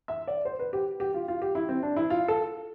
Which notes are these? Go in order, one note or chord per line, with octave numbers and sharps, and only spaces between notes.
E5
D5
C5
B4
G4
G4
F4
F4
G4
E4
C4
D4
E4
F4
A4